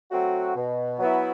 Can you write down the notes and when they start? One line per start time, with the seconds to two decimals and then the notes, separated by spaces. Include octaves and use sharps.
0.10 F#3 A3 C4 F#4
0.55 B2
0.98 F#3 B3 E4